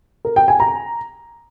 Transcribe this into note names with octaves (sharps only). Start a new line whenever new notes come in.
A#4
G5
G#5
A#5